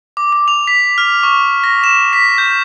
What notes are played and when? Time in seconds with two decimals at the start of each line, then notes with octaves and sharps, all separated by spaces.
0.17 D6
0.33 D6
0.48 F7
0.67 B6
0.98 F6
1.23 C#6
1.64 A#6
1.84 E7
2.13 B6
2.38 G6